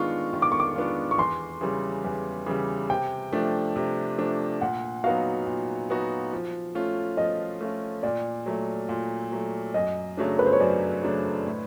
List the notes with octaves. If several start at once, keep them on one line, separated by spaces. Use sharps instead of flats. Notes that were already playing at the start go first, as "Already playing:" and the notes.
Already playing: D#3 G#3 B3 D4 F4 C#6
D#3
D6
C#6
D6
G#3 B3 D4 F4
C#6
E2 C6
C#3 E3 G3
E2
C#3 E3 G3
C3 G5
F3 A3 D4
C3
F3 A3 D4
A#2 F#5
F#3 B3 D#4 F#4 F5
A#2
F#3 B3 D#4 F#4
F3
A3 C#4 F4
F3 D#5
A3 C#4 F4
A#2 D5
F#3 A3
A#2
F#3 A3
F#2 D#5
C#3 F#3 A3 D4
B4
C5
C#5
F#2 D5
C#3 F#3 A3 D4
A2